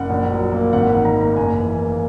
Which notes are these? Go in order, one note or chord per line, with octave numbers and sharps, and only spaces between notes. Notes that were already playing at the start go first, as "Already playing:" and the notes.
Already playing: F#1 F#5
A#1
F#3
A#3
G#1 F#5
F#5
D#3
A#5
A#3 A#5
F#1 G#5
E3
A#3